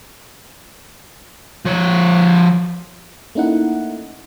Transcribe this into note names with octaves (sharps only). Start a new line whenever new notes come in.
F3 C#5
A3 A#3 C#4 D#4 E4 F#5